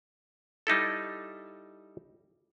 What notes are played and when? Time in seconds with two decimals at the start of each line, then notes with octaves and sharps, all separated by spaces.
0.67 G3 D#4 E4 A4